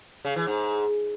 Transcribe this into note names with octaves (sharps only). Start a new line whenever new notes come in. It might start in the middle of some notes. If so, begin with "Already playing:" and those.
C#3
E3
G#2